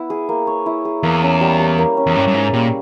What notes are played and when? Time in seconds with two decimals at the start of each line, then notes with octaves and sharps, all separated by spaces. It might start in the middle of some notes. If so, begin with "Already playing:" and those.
Already playing: B3 E4
0.10 G#4
0.29 A#3
0.47 C#5
0.66 E4
0.85 G#4
1.03 E2 A#3
1.22 C#4
1.41 G3
1.59 G4
1.78 A#3
1.97 C#4
2.07 E2
2.15 G2 C#4
2.27 G2
2.34 G#2 G#4
2.53 A#2 G3